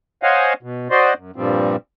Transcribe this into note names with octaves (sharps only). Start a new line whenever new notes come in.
C5 C#5 D#5 F5 F#5 G#5
B2
F#4 C5 D5 D#5 C6
F#2
G2 A#2 F3 G3 C4